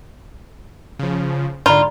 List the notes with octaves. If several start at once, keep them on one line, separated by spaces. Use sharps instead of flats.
C#3 F3
G#2 D3 F4 D5 A#5 B5